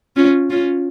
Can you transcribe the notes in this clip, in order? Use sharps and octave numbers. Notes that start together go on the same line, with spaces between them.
C#4 F4
C#4 F4